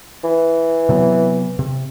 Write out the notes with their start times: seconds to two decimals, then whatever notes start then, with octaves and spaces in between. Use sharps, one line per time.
0.24 E3
0.89 C3 F#3 B3
1.59 C3